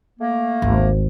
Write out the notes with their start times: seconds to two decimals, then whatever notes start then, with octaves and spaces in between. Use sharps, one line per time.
0.19 A3 A#3
0.62 G#1 D2